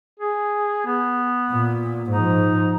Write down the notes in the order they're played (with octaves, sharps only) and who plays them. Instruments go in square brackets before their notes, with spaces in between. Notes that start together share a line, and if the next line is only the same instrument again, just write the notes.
[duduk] G#4
B3
[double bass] A#2
[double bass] G#2 F3 [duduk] D#4